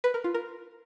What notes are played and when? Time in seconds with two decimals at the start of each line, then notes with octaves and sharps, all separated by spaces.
0.04 B4
0.14 A#4
0.24 F4
0.34 A#4